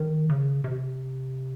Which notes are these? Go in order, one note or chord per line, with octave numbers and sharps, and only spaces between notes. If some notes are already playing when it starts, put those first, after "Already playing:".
Already playing: D#3
C#3
C3